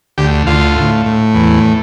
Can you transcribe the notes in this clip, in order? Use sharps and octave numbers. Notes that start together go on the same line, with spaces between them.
D2 G4
D2 F4
A2
A2
E2